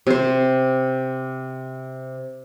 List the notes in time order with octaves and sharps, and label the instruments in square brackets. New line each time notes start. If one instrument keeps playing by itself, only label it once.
[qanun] C3 C5